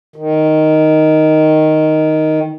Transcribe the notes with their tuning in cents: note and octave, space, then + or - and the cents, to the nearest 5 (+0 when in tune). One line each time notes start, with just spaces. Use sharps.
D#3 +0